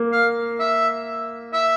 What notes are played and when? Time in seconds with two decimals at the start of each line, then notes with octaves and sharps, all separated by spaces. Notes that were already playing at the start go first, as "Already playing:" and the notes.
Already playing: A#3
0.12 F5
0.60 E5
1.53 E5